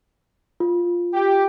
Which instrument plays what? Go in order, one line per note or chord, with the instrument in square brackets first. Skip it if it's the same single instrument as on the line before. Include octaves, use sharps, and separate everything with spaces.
[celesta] F4
[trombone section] G4